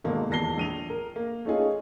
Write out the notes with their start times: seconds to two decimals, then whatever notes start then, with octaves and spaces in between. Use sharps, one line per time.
0.04 G#1 B2 G#3 A#3 A4
0.29 D#1 E2 A5 A#6 C7 G7
0.58 A#1 D#7 F7
0.90 A#4
1.16 A#3
1.45 A3 C#4 D#4 F4 G#4